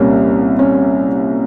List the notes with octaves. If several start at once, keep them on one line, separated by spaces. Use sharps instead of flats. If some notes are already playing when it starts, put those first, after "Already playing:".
Already playing: C2 A#2 G3 A#3 C#4
C#4